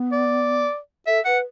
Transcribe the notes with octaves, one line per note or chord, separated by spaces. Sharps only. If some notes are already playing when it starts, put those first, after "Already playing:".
Already playing: B3
D5
A4 E5
B4 F#5